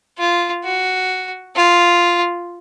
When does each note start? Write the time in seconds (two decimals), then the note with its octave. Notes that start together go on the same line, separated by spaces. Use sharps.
0.18 F4
0.64 F#4
1.56 F4